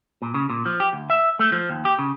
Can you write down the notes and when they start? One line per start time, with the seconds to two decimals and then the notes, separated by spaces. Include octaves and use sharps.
0.22 A#2
0.34 C#3
0.50 A#2
0.66 F3
0.80 G4
0.93 D2
1.10 E5
1.39 A3
1.52 F3
1.69 D#2
1.85 G4
1.99 C#3